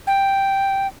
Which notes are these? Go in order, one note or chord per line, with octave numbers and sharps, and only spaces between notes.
G5